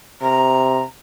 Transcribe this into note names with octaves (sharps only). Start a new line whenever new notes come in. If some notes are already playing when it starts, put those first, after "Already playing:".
C3 A#5